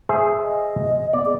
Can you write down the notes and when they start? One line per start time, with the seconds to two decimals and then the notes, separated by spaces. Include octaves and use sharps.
0.09 G#4 C5 E5
0.43 D#5
1.13 B3 D5
1.25 G#4